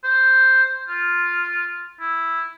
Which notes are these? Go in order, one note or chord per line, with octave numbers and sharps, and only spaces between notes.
C5
F4
E4